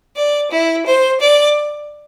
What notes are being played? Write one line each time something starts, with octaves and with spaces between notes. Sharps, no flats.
D5
E4
C5
D5